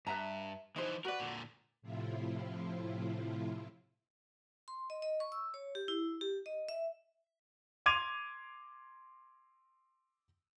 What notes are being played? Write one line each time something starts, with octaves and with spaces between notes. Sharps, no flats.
G2 B4 E5 A#5
E3 F3 D#4 C5
F#4 A#4 B4 D5
A#2 D3
A2 C3 F3 E4 F4
C6
D#5
D#5
C#6
E6
C#5
G4
E4
G4
D#5
E5
C6 D6 G#6 D#7 F7